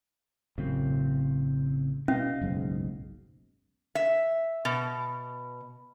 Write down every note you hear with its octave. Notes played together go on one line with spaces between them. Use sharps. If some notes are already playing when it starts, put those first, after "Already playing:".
A1 F#2 C#3 C4
B2 C#4 D#5 F5
F#1 B1 G#2
E5
B2